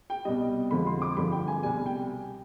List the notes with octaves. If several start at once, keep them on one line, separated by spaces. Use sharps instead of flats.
G5
C2 B2 G3 D#5
F2 D3 F3 G#3 B5
C6
D6
G#1 G2 D3 F3 B5
G5
G#5
C2 B2 G3 G#5
G5